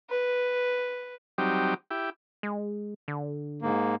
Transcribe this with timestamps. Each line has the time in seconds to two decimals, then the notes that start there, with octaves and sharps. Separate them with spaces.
0.10 B4
1.38 F#3 G3 C4 D#4 G4
1.90 E4 G4
2.43 G#3
3.08 D3
3.62 G#2 A#3